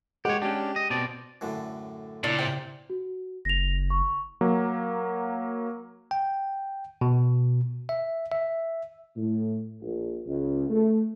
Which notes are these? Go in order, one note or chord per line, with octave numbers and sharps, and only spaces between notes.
G#3 G4 C#5 F#5
C#4 D4 G4
D#5
B2 C4 D5 A5
F#2 A2 D3
A#2 C#3 D4 E4
C3 G5
F#4
F#1 A#6 F7
C#6
F#3 A#3
G5
B2
E5
E5
A2
A#1
C#2
A3